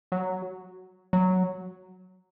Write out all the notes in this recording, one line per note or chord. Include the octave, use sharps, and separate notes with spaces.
F#3
F#3